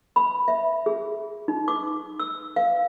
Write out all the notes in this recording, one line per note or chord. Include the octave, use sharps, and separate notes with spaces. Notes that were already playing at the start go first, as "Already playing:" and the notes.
B5
E5
G#4
D#4
D6
E6
F5